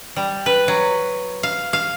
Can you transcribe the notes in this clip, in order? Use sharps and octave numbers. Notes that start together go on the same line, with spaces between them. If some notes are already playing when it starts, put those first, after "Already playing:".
G3
B4
F#3
F5
F5